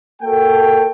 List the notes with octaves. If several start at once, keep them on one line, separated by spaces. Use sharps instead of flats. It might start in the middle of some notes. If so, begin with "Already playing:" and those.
A#3 F#4 A4 C#5 G5